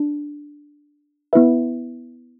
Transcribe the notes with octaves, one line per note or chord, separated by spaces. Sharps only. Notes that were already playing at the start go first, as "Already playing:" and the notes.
Already playing: D4
B3 E4 B4 E5